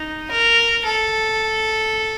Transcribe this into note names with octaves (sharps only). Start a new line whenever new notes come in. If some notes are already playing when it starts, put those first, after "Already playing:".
Already playing: D#4
A#4
A4